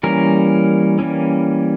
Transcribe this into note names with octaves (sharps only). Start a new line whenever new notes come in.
E3 G3 A#3 C#4 A#4
E3 G3 A#3 C#4